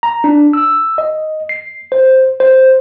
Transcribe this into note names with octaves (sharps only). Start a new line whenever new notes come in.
A#5
D4
E6
D#5
C7
C5
C5